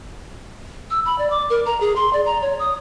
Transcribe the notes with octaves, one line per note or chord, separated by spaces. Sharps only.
E6
B5
D5
D6
A#4
A#5
G#4
C6
D5
A#5
C#5
D#6